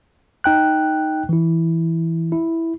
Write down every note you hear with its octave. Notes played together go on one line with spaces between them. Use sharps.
D#4 G5 F#6
E3 E4
E4